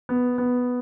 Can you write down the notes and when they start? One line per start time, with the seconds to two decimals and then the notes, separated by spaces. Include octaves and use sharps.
0.09 B3
0.38 B3